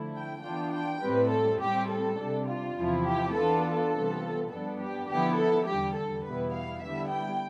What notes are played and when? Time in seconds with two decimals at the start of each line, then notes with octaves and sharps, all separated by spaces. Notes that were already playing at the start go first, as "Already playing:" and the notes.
Already playing: D3 F3 A3 E4
0.15 G5
0.43 E3 B3 D4 F4 G5
0.73 G5
1.02 A2 G3 C4 B4
1.31 A4
1.60 A2 G3 C4 G4
1.89 A4
2.18 C3 G3 D4
2.47 F4
2.76 E2 C3 F3 C4 E4
3.05 G4
3.35 E3 B3 D4 F4 A4
3.64 A4
3.92 C3 E3 G3 B3 F4
4.50 G2 F3 B3 D4 A4
4.80 G4
5.09 D3 F3 B3 E4 G4
5.38 A4
5.67 E2 D3 G3 G4
5.95 A4
6.25 E2 B2 G3 B3 E4 B4
6.54 F5
6.83 D3 G3 B3 E4 E5
7.12 G5